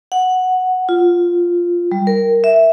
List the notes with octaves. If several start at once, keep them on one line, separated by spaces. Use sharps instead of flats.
F#5
F4
G3
A#4
E5